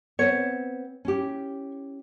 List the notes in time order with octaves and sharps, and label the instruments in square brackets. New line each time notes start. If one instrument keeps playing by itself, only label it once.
[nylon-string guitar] B3 C4 [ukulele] C#5
[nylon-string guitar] C#4 E4 G4